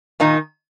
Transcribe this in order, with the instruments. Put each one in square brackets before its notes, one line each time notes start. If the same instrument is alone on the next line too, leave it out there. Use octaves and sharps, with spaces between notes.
[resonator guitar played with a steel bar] A#2 D#3 D#4